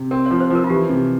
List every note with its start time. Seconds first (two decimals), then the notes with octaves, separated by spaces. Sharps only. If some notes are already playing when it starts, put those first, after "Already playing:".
Already playing: C3
0.11 C4 A#4
0.26 F3 C#5
0.40 C5
0.50 F3 A#4
0.64 F4
0.70 E3 G4
0.89 C3